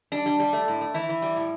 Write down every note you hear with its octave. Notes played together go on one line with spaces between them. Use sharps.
G3 D4
G3
G3
A3
A2
A3
E3 E4
E3
G3
A2